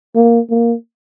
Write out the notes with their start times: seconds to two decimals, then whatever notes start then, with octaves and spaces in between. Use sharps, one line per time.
0.16 A#3
0.50 A#3